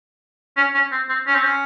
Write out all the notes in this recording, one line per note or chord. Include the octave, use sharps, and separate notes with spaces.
C#4
C#4
C4
C4
C#4
C4
C#4